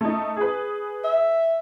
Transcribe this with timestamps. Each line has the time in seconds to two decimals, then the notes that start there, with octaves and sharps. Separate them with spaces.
0.01 A3 D#4
0.36 G#4 B4
1.04 E5